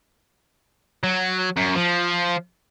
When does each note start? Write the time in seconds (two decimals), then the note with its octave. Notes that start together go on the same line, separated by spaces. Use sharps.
1.04 F#3
1.57 F#2
1.75 F3